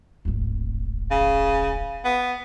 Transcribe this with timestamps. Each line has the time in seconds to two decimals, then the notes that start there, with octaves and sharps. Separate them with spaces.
0.25 D1 G#1
1.11 C#3
2.04 B3